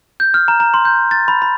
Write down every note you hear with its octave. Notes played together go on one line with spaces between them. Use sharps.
G6
F6
A#5
A#5
C6
G6
A6
B5
B5